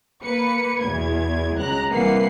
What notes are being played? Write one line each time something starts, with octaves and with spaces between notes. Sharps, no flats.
A#3 B4 C#7
E2 B2 G#6
C#2 A#5 F#6
C2 E3 A#3 B4 F#5 C7